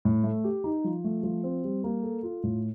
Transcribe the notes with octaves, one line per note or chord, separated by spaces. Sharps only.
A2
A3
G4
D#4
F3
A3
F3
C4
G3
A#3
A4
F4
A2